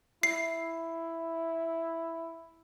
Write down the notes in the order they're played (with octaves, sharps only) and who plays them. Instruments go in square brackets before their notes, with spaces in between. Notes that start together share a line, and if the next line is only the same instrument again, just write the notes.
[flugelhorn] E4 [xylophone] C7